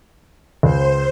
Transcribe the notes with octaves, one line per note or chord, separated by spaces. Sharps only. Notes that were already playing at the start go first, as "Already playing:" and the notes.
C#2 C5